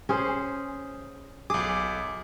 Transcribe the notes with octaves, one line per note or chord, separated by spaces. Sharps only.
C#4 G#4 C5
B1 G#4 D6